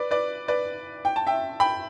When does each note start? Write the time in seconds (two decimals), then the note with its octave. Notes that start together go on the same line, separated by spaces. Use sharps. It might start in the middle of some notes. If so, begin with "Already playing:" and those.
Already playing: B4 D5
0.11 B4 D5
0.48 B4 D5
1.05 G5
1.16 A5
1.27 E5 G5
1.60 G5 B5